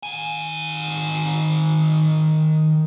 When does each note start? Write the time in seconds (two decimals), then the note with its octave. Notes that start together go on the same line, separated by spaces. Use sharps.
0.03 D#3 G#5